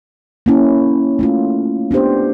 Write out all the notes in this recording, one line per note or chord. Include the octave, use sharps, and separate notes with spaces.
A#3 C#4 E4
A3 C#4 F4
B3 D4 G4 C5